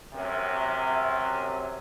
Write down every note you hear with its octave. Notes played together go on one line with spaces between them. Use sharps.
F#2 C3